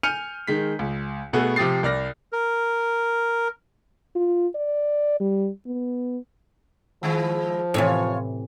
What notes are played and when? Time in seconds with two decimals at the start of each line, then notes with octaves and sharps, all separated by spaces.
0.03 G#5 F6 G6 C#7 D#7 F7
0.47 D#3 G#3 B6
0.79 C#2
1.33 B2 A3 B3 F#4 G#4
1.56 C3 F3 G4 D#6 A6 C7
1.83 C2 D5 F6 A#6
2.33 A#4
4.15 F4
4.55 D5
5.20 G3
5.66 B3
7.03 D#3 F3 G#3 E4
7.74 A2 C3 E3 F4 C#5